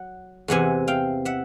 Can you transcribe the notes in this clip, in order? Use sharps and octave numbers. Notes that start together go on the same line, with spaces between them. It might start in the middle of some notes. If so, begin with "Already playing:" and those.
Already playing: F#3 F#5
E2 C3 E3 F#5 G#5
F5 G5
E5 F#5